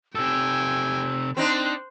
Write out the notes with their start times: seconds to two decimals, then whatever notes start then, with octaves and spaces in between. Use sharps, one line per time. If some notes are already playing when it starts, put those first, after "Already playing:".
0.15 C3 A4 G5 G#5 E6
1.37 C4 D4 D#4 C5 F#6